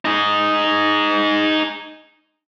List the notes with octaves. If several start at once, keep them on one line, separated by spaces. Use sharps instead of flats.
D#4 G#4